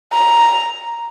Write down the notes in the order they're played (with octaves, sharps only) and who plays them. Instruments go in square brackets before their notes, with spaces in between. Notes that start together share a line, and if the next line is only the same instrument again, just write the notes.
[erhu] A#5